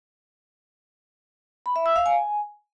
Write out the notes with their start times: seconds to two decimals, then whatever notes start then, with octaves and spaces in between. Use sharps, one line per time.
1.66 B5
1.76 E5
1.86 E6
1.96 F5
2.06 G#5